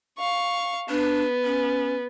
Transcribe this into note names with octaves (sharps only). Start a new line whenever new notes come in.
F5 C#6
B3 D4
C#4